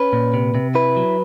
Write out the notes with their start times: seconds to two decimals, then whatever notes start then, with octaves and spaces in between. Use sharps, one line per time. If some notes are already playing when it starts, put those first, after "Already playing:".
Already playing: C#4 B4
0.13 A#2
0.34 C3
0.55 C3
0.75 E4 B4
0.96 F#3